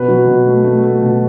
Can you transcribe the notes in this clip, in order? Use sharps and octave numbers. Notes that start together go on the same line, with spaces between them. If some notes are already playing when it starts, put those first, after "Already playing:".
Already playing: B2 B4
F#3
B2
A3
A3
A3
B2